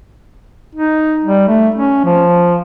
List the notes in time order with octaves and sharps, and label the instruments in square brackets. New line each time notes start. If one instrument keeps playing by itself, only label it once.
[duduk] D#4
G3
A3
C#4
F3